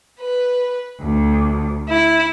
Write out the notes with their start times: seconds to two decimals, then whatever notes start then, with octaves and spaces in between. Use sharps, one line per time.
0.21 B4
1.01 D2
1.89 E4